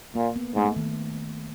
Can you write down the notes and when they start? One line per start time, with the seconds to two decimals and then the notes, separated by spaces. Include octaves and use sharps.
0.15 A#2 A#3
0.36 B3
0.55 G#2 A3
0.76 D#3